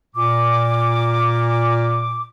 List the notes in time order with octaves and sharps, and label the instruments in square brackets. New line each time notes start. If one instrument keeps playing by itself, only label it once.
[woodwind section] A#2 D6